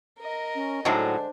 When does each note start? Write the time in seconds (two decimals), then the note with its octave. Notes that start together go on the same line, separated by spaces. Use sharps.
0.19 A#4 D#5
0.55 C#4
0.85 A2 D3 F#3 G#3 D4 D#4 C5